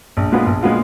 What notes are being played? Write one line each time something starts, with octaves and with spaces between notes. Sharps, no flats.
A#1
A#2 G#3 B3 F4
A#1
A#2 G#3 B3 F4